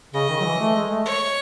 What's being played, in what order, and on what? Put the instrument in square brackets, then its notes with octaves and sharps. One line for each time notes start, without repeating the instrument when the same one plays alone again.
[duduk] C#3 [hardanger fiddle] D#5
[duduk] D#3
F#3
E3
A3
G#3
A3
[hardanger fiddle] C#5